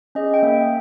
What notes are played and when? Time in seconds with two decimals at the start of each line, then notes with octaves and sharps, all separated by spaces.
0.15 C#4 G#4 D#5
0.34 G5
0.42 A#3 E5